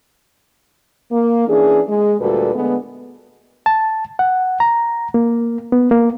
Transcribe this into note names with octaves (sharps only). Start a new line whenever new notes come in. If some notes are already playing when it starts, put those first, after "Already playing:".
A#3
E3 C#4 D4 G#4
G#3
D2 A#2 G3 F#4 A4 B4
D3 G#3 A3 B3
A5
F#5
A#5
A#3
B3
A#3